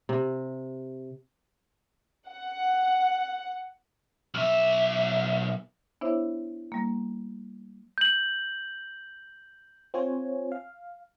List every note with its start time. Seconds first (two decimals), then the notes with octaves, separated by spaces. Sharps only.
0.09 C3
2.27 F#5
4.34 B1 E5
6.01 B3 D4 E4 C5 C#5 E5
6.72 G3 A#3
7.98 G6 F#7
9.94 C4 F4 C5 C#5 G#5
10.52 F5